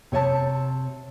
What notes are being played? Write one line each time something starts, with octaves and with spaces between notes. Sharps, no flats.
C3 C#5 D#5 A5